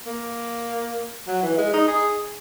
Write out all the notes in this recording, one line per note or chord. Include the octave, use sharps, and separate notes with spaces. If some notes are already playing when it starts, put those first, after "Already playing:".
A#3
F#3
E3
G#3
D#4
G#4